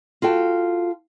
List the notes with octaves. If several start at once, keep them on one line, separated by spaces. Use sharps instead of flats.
F4 F#4 A4 G5